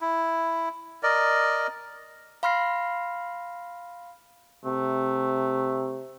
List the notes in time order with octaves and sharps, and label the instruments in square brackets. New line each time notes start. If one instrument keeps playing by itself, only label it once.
[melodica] E4
A#4 D5 D#5
[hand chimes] F5 B5 C6 F6 A#6 C7
[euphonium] C3 [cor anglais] A3